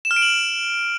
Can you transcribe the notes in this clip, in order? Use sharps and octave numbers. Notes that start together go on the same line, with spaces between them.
E7
F6
D7
F#7